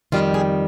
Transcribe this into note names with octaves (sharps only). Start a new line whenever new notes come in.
F2 D#3 G3 F4
G#4